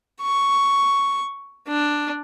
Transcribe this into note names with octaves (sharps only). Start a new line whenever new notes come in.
C#6
D4